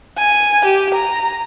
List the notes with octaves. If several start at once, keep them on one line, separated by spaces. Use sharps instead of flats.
G#5
G4
A#5